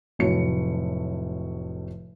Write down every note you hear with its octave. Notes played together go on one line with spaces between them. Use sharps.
F1 A2 F#3 C#5 C#7